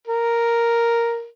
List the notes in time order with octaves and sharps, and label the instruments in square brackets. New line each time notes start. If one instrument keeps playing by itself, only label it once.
[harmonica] A#4